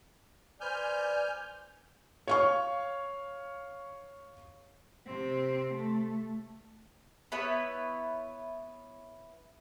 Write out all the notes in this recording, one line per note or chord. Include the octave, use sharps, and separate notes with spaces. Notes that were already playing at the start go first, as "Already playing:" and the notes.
B4 C5 D5 G#5 F6 G6
C#5 F5 C#6
C3 C4
A3
B3 E4 B4 C#5